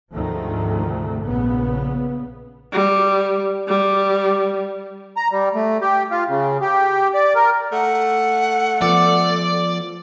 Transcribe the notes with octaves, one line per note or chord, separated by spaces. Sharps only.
D2 G#2 C3 D#3 F3 A3
A#1 C#3 B3
G3
G3
A#5
G3
A3
G4
F4
C#3
G4
D5
A#4
A3 F#5
F3 B3 D5